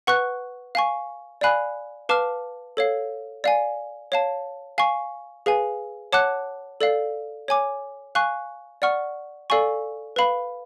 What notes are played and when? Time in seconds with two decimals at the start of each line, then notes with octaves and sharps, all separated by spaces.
0.07 B4 F#5 C#6 F#6
0.75 F5 G#5 C#6
1.41 D5 F5 G#5 B5 F#6
2.09 B4 F5 A5 D6 F6
2.77 A4 C#5 F5
3.44 D5 F5 G#5
4.12 C#5 F5 A5
4.78 F5 G#5 C#6
5.46 G#4 B4 F5 G#5
6.13 C#5 F#5 A5 D6 F#6
6.81 A4 D5 F5
7.48 C#5 G#5 D6
8.15 F5 G#5 C#6 F#6
8.82 D5 F#5 C#6 F6
9.50 A4 D5 F5 G#5 C#6
10.16 B4 F5 B5